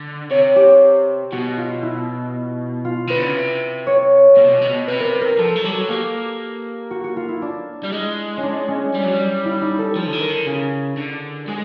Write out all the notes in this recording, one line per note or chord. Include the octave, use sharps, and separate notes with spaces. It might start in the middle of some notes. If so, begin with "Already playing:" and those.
Already playing: D3
C3 C#5
G4
B2 F#4
F4
E4
F4
D#3 B4
D3
C#3
C3
C#5
B2
C3
B2
C3
B2
C3 B4
A#4 B4
A#4
F3 A4
F#3
G3 A4
F#3
A#3 G4
F#4
F#4
F4
E4
D4
G3
G#3
C#4
D4
C#4
G3
F#3
G3
E4
D#4
A4
F3 A4
D3
D#3
A#4
D3
C#3 G#4
D3
G#3 G#4